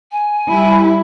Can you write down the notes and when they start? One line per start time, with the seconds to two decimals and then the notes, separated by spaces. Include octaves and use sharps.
0.12 G#5
0.47 G3 E4